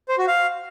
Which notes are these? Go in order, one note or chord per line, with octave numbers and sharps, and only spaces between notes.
C5
F#4
F5